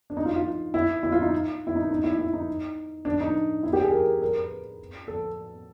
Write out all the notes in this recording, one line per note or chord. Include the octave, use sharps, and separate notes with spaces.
D4
D#4
F4
F4
E4
E4
F4
D#4
E4
D#4
D#4
E4
E4
D#4
D4
D#4
E4
G4
G#4
A#4
A#4
B4
A4